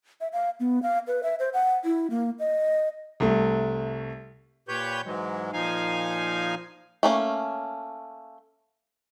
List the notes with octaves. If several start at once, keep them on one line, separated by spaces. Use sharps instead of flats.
E5
F5
B3
F5
B4
E5
C5
F#5
E4
A#3
D#5
C2 A3
A#2 G4 B4 C#5 G6
G#2 E3 F#3 G#3
A#2 F3 D#4 F5 G#5
A3 A#3 C#4